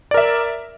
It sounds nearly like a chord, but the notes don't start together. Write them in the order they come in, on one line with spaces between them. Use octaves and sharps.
D5 A#4 E5